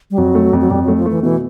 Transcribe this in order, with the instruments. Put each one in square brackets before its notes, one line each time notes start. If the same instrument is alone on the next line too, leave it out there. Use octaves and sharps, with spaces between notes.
[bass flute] G3
[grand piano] F2 [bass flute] F#3
[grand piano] A3
F2
[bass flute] F#3
[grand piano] F2 [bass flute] G3
[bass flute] F#3
[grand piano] A3
[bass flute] F3
[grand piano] A3
[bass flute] E3
[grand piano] B2 [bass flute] E3